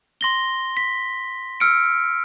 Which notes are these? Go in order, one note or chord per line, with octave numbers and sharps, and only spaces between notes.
C6 A#6 G7
B6
E6 F6 C#7 D7